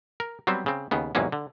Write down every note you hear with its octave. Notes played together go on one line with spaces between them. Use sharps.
A#4
F#3 G3 B3 C4 C5
C#3 C4
D#2 C#3 B3
E2 G#2 C3 F#3 A#3 C#4
D3